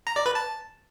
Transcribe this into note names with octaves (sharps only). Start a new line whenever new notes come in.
A#5
D5
B4
A5